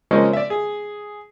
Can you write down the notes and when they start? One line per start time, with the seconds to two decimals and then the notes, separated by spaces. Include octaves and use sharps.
0.11 C#3 F3 G#3 A#3 C4 C#4
0.33 D5 E5
0.50 G#4